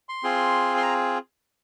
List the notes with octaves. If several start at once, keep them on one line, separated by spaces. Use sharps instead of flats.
C6
C4 F4 G#4
C6
A#5